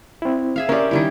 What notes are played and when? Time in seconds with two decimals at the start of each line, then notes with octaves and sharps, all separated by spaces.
0.22 C4 E4
0.56 G#4 E5 F5
0.69 C#4 G4 A#4 D5
0.91 D#3 G3 E4